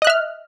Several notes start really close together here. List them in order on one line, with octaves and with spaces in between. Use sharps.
D#5 F#6 E5 F6